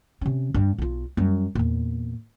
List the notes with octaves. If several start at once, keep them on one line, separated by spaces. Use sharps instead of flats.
C3 C#4
G2 D4
B1 F4
F#2 G3
E2 A#2